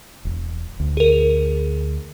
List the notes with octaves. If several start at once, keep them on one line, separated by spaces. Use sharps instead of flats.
E1
D2
G#4 A#4